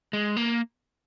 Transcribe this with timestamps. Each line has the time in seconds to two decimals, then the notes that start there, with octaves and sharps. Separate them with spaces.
0.13 G#3
0.37 A#3